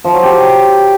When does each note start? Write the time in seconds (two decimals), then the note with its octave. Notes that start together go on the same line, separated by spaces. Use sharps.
0.04 F3
0.14 F#3
0.23 G4